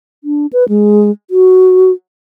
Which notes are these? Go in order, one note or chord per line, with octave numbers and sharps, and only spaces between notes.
D4
B4
G#3
F#4